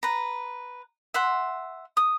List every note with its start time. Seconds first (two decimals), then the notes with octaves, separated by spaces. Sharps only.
0.03 B4 A#5
1.14 E5 F#5 C6
1.97 D#6